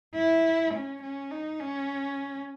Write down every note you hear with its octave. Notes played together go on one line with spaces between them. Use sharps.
E4
C#4
C#4
D#4
C#4